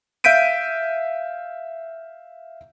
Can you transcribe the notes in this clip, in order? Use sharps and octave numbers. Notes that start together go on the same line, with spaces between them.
E5 F5 G6 B6 D7 D#7